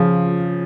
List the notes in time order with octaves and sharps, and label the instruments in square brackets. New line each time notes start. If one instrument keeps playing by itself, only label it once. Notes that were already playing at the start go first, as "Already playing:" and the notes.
Already playing: [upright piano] C#3 F3